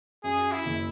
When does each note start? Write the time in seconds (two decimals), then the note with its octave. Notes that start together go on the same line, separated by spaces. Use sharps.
0.24 F#2 G#4
0.52 E4
0.65 F#1